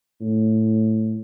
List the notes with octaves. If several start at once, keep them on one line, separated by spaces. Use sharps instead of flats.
A2